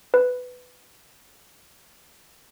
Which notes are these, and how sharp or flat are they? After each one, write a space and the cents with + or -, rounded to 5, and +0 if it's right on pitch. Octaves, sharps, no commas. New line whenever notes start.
B4 +15